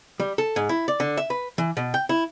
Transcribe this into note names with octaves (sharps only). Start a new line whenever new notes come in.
G3
A4
G#2
E4
D5
D3
E5
B4
E3
B2
G5
E4